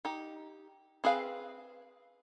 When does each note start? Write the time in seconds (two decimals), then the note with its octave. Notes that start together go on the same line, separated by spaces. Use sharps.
0.05 D#4 G4
1.04 C4 G#4 B4 F5